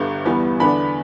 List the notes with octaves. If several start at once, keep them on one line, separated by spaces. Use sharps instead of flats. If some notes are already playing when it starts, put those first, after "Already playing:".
Already playing: G1 G2 D3
E2 E3 G3 B3
E2 D3 B3 D4 B5